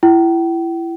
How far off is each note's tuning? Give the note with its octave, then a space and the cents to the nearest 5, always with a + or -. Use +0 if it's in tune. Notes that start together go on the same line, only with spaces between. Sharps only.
E4 +25 G5 -40